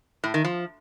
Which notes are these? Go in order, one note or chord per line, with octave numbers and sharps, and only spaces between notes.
A2
D#3
F3